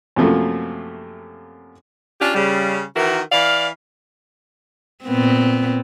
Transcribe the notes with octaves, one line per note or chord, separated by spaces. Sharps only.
F#2 C3 F3 A3 A#3
C#4 D4 F4 G4
C#3 G3
D#3 E3 F#4 A#4
E3 D5 F5
A#2 B3 C4